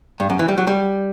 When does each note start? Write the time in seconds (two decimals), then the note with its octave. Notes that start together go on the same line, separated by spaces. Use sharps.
0.20 G2
0.30 F#2
0.39 E3
0.48 G3
0.58 F#3
0.67 G3